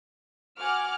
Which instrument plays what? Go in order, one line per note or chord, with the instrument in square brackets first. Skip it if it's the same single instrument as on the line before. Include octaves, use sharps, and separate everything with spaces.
[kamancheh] F#4 G#5 [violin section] F#5 D6 F6